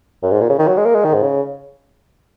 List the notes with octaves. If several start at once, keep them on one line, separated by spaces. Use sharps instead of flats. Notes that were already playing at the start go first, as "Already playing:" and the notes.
F#2
G#2
A#2
C#3
D#3
F#3
G#3
A#3
G#3
D#3
G#2
C#3